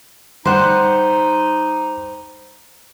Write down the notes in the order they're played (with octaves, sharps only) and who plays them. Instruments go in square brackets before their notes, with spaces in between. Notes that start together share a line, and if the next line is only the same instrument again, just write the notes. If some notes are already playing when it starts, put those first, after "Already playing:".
[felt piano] G3 [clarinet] D#4 [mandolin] C5 F#5